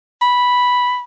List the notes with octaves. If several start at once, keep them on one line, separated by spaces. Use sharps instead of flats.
B5